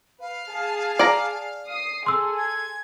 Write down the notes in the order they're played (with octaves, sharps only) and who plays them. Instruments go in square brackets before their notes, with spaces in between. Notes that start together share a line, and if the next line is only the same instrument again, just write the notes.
[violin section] B4 [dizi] F5
[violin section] G#4 A5
[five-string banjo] D5 A#5
[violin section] D#6 C7
[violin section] G#4 A4 [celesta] C6 E6
[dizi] G#6